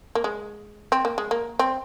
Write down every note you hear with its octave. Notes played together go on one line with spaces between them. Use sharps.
A#3
G#3
C4
A#3
G#3
A#3
C4